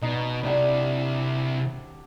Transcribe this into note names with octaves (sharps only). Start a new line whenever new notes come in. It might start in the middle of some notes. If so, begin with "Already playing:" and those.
B2 D#4
C3 D4 E4 G4 F#5